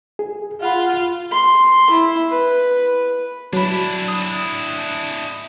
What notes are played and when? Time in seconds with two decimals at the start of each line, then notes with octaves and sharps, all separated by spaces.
0.19 G#4
0.61 F4 F5 F#5 B5
1.31 C6
1.90 E4
2.31 B4
3.53 F#3 D4 E4 B5
4.08 D#6